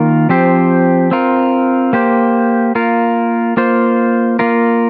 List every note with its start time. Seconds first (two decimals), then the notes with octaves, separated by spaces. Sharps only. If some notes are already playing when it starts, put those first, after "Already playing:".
Already playing: D#3 A#3 F4 A#4
0.29 F3 C4 G4 C5
1.11 C4 F4 A#4
1.93 A#3 G4 C5
2.75 A#3 F4 A#4
3.57 A#3 F4 C5
4.39 A#3 F4 A#4